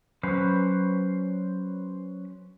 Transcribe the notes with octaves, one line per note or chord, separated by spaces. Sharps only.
F#3 C#4 B4 C5